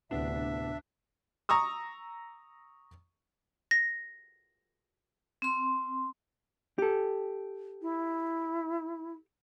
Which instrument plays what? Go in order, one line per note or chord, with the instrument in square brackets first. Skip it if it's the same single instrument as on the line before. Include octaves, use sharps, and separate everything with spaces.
[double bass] D2 [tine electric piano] A2 C3 B3 [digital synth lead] D4 [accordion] E5
[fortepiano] A#5 C#6 D#6 E6
[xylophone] A#6
[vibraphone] C4 C6
[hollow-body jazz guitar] G4 A4
[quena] E4